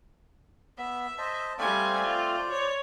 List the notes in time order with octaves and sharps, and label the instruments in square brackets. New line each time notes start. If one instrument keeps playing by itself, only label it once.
[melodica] B3 [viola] E5
[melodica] C5 D#5 A5
[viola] G3 G#5 [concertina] A3 C4 F5 [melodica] C5 D5
[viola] F4
C#5